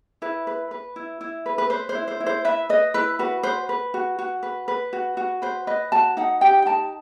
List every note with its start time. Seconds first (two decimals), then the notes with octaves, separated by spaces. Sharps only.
0.22 E4 B4
0.47 B4
0.71 B4
0.96 E4
1.21 E4
1.46 B4
1.58 B4
1.70 B4 C5
1.89 C5
1.95 E4
2.08 C5
2.20 E4
2.26 C5
2.45 B4 E5
2.69 B4 D#5
2.94 E4 B4
3.19 F#4 B4
3.43 B4 C5
3.69 B4
3.94 F#4
4.19 F#4
4.43 B4
4.68 B4
4.93 F#4
5.17 F#4
5.42 B4 C5
5.67 B4 D#5
5.92 F#4 A5
6.17 D#4 F#5
6.41 G4 G5
6.62 G5
6.66 D#4 A5